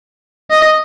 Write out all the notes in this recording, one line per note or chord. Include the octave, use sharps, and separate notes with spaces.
D#5